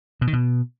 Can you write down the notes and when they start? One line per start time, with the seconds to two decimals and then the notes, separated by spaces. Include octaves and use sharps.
0.21 B2
0.27 D#3
0.33 B2